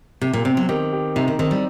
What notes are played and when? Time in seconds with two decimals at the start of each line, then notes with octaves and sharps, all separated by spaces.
0.21 C3 G4
0.33 A#2
0.45 C3 C4
0.57 F#3
0.69 D#3 G4
0.93 G4
1.16 C3 D#4
1.28 D#3
1.39 D#3 C4
1.51 G3